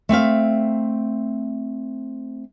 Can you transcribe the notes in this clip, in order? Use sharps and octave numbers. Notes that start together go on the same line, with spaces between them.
A3 C4 E5 F5